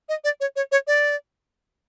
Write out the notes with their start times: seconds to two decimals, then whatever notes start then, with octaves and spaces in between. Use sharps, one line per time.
0.09 D#5
0.24 D5
0.40 C#5
0.56 C#5
0.72 C#5
0.87 D5